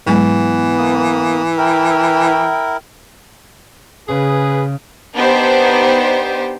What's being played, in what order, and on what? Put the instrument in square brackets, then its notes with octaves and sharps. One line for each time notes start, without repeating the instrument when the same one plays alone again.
[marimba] G#2 F#3 G#3 [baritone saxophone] E3 [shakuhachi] B3
[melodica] A#3 D#6
[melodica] E4 A#4 [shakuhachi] G5
[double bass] C#3 [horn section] G#4 B4
[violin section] B3 D4 D#4 G4 C5